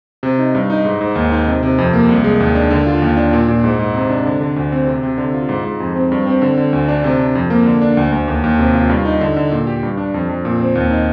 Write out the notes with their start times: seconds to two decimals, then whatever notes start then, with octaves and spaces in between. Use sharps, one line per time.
0.23 C3
0.38 D#4
0.55 G2
0.70 D#4
0.85 G#2
1.01 G#2
1.15 D#2
1.32 D#4
1.47 C3
1.63 C3
1.78 F2
1.93 A#3
2.09 C2
2.24 G#3
2.40 D#2
2.55 D4
2.70 D3
2.86 F4
3.02 D#2
3.17 D4
3.33 A#2
3.48 A#2
3.64 G#2
3.79 G#2
3.95 C3
4.10 D4
4.25 D3
4.41 D3
4.56 D2
4.72 C4
4.87 C3
5.03 C3
5.18 D3
5.34 F4
5.49 G#2
5.65 G#2
5.80 F2
5.96 C4
6.12 G2
6.27 C4
6.42 D3
6.57 D3
6.73 D2
6.88 D4
7.04 C3
7.19 D4
7.35 F2
7.50 A#3
7.66 D3
7.82 D4
7.97 D2
8.12 D2
8.28 D#2
8.44 D#2
8.59 C3
8.75 F4
8.89 G2
9.05 D#4
9.21 D3
9.36 D3
9.51 A#2
9.67 G4
9.83 G2
9.97 D4
10.14 F2
10.29 F2
10.45 A#2
10.60 C4
10.75 D#2
10.91 D#4